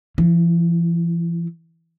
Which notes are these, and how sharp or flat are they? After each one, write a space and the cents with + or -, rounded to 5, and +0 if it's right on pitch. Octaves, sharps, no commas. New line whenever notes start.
E3 +45 E4 +0